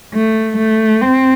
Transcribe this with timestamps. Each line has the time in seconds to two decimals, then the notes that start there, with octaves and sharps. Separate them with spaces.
0.14 A3
0.57 A3
1.01 C4